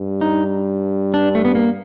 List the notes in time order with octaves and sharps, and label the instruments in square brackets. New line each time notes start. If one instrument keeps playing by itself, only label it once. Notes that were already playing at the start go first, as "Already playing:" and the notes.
Already playing: [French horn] G2
[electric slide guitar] D#4
D4
A3
B3
A#3